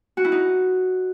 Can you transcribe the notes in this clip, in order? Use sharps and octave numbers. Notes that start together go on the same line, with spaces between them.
F#4
E4
D#4